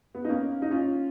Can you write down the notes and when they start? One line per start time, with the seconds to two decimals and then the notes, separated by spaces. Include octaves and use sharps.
0.15 B3
0.25 D#4
0.29 A#3 C#4
0.62 D#4
0.71 C#4 F4